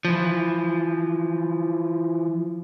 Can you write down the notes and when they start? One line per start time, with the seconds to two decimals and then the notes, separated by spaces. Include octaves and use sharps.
0.05 E3 F3